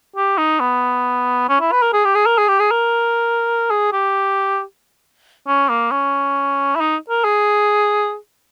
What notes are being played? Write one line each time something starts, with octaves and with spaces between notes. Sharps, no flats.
G4
D#4
B3
C#4
E4
B4
A#4
G#4
G4
G#4
A#4
G#4
G4
G#4
A#4
G#4
G4
C#4
A#3
C#4
E4
D#4
A#4
G#4